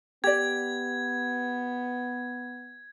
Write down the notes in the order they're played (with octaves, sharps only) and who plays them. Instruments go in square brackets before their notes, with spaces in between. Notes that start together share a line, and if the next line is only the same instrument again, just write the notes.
[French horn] B3 [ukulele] G4 D5 [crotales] G#6